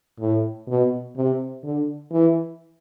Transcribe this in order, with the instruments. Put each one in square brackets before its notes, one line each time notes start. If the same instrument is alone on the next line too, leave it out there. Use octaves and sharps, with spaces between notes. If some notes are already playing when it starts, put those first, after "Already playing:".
[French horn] A2
B2
C3
D3
E3